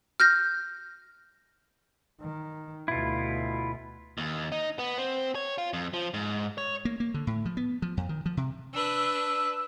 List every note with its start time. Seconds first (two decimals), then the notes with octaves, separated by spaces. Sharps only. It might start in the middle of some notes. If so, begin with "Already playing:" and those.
0.20 F6 G6 A#6
2.21 D#3
2.88 D2 B2 E4 F4
4.18 D#2
4.52 D#4
4.79 B3
4.98 C4
5.35 C#5
5.58 F4
5.73 F2
5.94 F3
6.14 G#2
6.58 C#5
6.85 A#3
7.00 A#3
7.14 D3
7.27 A2
7.45 F3
7.57 B3
7.82 F3
7.97 F2
8.09 D#3
8.26 F3
8.37 C3
8.73 D4 B4 E6